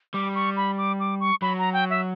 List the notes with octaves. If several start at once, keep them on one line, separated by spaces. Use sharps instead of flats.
G3 D6
C#6
B5
D6
D6
C#6
F#3 B5
A#5
G5
E5